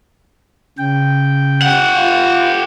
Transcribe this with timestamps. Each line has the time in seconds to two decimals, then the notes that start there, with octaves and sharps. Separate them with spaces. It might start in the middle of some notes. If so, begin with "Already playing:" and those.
0.78 C#3 G5
1.62 G4 F#5
1.96 F4